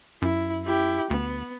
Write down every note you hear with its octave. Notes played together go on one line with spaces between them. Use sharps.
F#2 E4
E4 G4
D2 B3